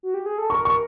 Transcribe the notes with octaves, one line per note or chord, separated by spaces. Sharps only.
F#4
G4
G#4
A4
A#4 C#6
C#6